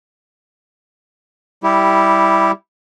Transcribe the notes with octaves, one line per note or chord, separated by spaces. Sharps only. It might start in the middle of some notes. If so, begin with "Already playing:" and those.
G3 E4 G4